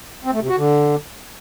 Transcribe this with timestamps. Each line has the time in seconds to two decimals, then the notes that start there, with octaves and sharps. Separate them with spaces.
0.25 C4
0.33 A3
0.41 C3
0.49 F#4
0.57 D3